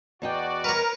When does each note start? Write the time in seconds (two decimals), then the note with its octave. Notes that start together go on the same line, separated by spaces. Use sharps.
0.22 E2 F#4 D5 D#5 G5
0.64 A#4 B4 C#5 A#5